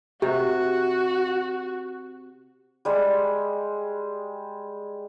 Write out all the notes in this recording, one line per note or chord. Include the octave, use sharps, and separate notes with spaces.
C3 F#4 G4
G3 G#3